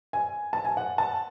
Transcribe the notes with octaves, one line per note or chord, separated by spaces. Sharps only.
G#5
A5
G#5
F#5
A5